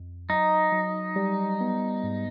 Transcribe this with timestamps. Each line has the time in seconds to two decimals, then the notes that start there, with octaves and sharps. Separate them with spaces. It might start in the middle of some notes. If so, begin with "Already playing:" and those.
Already playing: F2
0.29 F#3 D#4
0.72 F#3
1.16 G3
1.61 B3
2.04 G#2